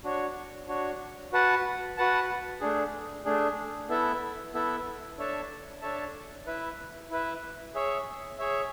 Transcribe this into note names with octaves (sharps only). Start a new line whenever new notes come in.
D4 F#4 C#5
D4 F#4 C#5
F#4 B4 F#5 A5
F#4 B4 F#5 A5
A3 D4 G#4
A3 D4 G#4
B3 E4 A4 E5
B3 E4 A4 E5
D4 A4 C#5 E5 A5
D4 A4 C#5 E5 A5
E4 B4 E5
E4 B4 E5
G#4 C#5 E5
G#4 C#5 E5